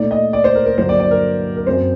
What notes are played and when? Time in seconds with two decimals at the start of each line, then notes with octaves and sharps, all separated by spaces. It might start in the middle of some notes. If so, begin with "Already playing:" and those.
Already playing: A#2 A3 D#4 D5
0.11 D#5
0.33 D5
0.44 C5
0.55 A#4
0.66 A#4
0.78 G2 D3 F#3 A#3 C5
0.89 D5
1.00 D5
1.11 A#4
1.57 A#4
1.66 F#2 F#3 C4 C5